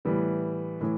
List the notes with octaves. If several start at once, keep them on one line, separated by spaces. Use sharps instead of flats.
A2 E3 G3 B3
A2 E3